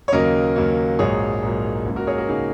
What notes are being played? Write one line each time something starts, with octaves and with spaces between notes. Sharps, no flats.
C#5
D#2 C#3 F#3 A#3 A#4 D#5
D#2 C#3 F#3 A#3
A#1 G#2 F#3 A#3 G#4 C#5
A#1 G#2 F#3 A#3
C#2 C#3 A#3
F#4 A#4
G#4 C#5
F#4 A#4
C#3 A#3 D#4 G#4